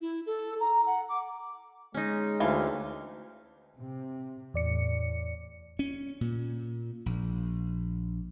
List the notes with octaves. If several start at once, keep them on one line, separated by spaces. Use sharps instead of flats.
E4
A4
A#5
F#5
D6
G#3 C#4 D#4
D2 E3 F5
C3
E2 A2 D5 C#7
C#4
A#2
A#1